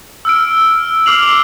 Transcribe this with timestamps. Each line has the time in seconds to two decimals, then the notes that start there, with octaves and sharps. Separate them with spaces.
0.25 E6 F6 D7
1.06 D6 F6 C7 F7 F#7